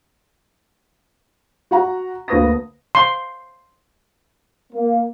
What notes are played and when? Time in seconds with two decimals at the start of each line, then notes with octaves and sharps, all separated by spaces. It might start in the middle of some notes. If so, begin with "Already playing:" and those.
1.71 F#4 F#5 A#5
2.28 D2 A#3 B4 D#6 A#6
2.95 C6
4.73 A#3